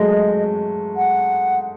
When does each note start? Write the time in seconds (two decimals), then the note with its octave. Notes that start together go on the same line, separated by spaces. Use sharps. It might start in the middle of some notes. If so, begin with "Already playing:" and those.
Already playing: F#3 G#3 A3 D#5
0.97 F#5